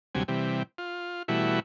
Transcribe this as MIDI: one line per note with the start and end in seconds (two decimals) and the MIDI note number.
0.15 0.23 38
0.15 0.23 48
0.15 0.23 54
0.15 0.23 55
0.15 0.23 80
0.28 0.63 48
0.28 0.63 52
0.28 0.63 55
0.78 1.23 65
1.28 1.60 47
1.28 1.60 52
1.28 1.60 55
1.28 1.60 57
1.28 1.60 64
1.28 1.60 66